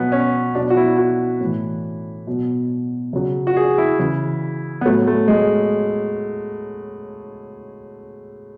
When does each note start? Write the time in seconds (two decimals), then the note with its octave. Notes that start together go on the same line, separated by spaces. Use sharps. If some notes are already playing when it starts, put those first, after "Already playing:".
Already playing: B2 F#3 B3
0.12 C#4
0.55 B2 F#3 D4
0.70 F#4
0.77 E4
0.98 F#4
1.41 A2 E3
2.27 B2 F#3
3.13 C#3 F#3
3.47 F#4
3.57 G#4
3.78 E4
3.99 C#3 E3
4.81 B3
4.85 A2 F#3 A3
5.07 A3
5.28 G#3